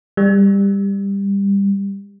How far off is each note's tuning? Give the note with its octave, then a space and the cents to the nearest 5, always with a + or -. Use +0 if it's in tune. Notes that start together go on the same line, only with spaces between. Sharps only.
G3 +20